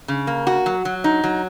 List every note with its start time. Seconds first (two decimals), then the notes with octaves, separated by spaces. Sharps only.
0.08 C#3
0.27 A#3
0.47 F#4
0.66 F#3
0.85 F#3
1.04 D#4
1.24 F#3